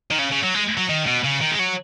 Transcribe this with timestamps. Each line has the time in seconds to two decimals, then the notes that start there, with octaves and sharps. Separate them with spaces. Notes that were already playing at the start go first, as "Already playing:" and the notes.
0.11 D#3
0.19 C#3
0.31 C#3
0.43 F#3
0.54 G#3
0.77 F#3
0.89 D#3
1.07 B2
1.25 C#3
1.42 D#3
1.52 G#3
1.60 F#3